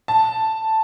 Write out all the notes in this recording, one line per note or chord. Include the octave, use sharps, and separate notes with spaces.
A5